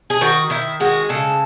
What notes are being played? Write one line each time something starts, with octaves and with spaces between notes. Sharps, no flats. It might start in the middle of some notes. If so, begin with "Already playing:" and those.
G#4
D#3 F#4
D#3 E4
G#3 F#4
C#3 A4